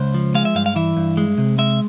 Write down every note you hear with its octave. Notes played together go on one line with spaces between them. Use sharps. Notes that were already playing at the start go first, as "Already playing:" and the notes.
Already playing: C#2 C5
F3
G#3 F5
E5
G2 F5
F5
E3 E5
G2
G#3
C3
G#3 E5